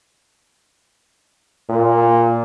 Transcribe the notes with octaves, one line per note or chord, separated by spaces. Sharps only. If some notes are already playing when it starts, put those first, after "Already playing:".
A#2